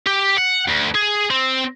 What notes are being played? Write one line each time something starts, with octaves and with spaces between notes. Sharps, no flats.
G4
F#5
D2
G#4
C4